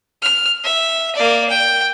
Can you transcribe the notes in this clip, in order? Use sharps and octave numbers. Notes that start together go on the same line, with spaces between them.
F6
E5
A#3 D5
G5